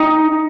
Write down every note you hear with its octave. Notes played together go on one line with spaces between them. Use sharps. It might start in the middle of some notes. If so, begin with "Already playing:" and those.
Already playing: D#4